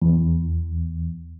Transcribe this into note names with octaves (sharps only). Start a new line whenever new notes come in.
E2